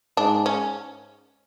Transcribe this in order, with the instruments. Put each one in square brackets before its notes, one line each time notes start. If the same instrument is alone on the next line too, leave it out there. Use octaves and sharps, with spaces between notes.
[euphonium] G#2 [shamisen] D4
[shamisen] C#4